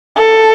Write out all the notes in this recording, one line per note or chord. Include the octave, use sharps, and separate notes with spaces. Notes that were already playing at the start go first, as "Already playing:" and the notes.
A4